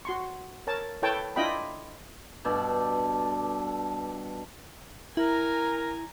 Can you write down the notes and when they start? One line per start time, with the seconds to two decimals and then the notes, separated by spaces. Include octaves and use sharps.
0.05 F#4 C6 C#6
0.67 A#4 C#5 A5
1.02 E4 A4 B4 C#5 G5 A5
1.36 D4 E4 F4 D#5 G5 B5
2.45 G2 B2 A4 D5
5.17 E4 A#4 G#5 A#5